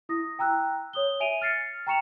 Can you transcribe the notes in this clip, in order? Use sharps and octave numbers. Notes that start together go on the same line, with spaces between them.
E4 D#6 A#6
G5 A#5 E6 F#6
C#5 D#6 G7
E5 G#5 D7 D#7 F7
F6 A6 C7 C#7
G5 A#5 C#6 C#7 E7 F7